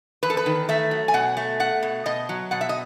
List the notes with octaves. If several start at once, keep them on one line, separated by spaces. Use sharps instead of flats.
E2 B4
A4
B4
D#3
A3 E5
F#3
G#5
B2 F#5
A3
A3 F#5
B2
B2 D#5
F#3
B2 F#5
E5
D#5